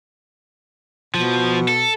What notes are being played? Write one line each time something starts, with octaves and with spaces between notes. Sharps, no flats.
B2 F3
A4